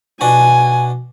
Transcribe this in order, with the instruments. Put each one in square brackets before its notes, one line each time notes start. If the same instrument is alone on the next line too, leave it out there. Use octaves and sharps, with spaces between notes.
[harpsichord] B2 D4 F#4 [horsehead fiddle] G#5